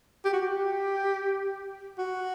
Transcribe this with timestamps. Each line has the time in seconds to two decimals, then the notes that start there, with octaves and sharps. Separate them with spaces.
0.25 G4
0.33 F#4
0.41 G4
1.98 F#4